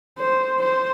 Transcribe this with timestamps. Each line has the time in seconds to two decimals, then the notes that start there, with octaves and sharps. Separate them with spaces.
0.18 C5
0.60 C5